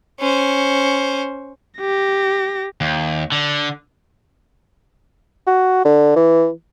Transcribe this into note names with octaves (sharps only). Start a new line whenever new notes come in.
C#4 C5
G4 A#6
D#2
D3
F#4
D3
E3